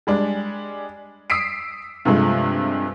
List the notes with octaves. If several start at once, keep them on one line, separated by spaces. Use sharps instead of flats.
G3 G#3 D4
D#6 E6 B6 C7 D7
G2 C3 F3 G#3 A3